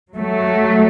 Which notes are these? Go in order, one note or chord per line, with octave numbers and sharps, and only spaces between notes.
F#3 A3